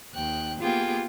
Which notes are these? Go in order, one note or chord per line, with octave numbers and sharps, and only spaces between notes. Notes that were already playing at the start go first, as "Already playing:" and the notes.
D#2 G5 F#6
A#3 B3 F4 G4 G#4 G5